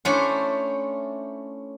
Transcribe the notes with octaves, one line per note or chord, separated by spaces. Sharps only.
A3 C#4 D4 E4 C5 G#5